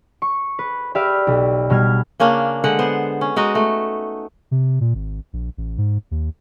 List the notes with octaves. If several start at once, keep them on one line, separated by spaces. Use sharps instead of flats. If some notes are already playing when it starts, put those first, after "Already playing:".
C#6
B4
G4 B4 D5 E5 F5
B1
B2 G3 F6 G#6
C#3 A#3 C#4 D4
D3 G#3 F#5
B3 C5
C#4
G#3 D#4 F#4
A3
C3
A#2
G#1
A#1
A1
G#2
D#2